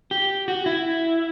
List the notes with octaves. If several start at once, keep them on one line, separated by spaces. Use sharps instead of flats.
G4
F#4
E4